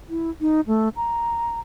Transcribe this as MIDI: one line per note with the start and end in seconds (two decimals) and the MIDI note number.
0.09 0.30 64
0.41 0.61 63
0.67 0.89 57
0.96 1.59 82